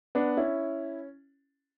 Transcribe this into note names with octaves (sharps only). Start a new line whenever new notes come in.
B3 D4
C#4 E4